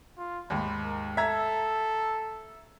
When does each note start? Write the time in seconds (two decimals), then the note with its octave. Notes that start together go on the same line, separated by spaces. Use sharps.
0.18 F4
0.50 D#2 G#2 B5
0.84 A#4
1.17 A4 E5 A#5 G#6